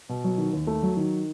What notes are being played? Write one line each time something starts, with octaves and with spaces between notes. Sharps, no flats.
B2
F#3
D#3
D#2
A3
F#3
D#3